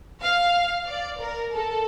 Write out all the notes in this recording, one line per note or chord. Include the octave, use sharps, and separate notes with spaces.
F5
D5
A#4
A4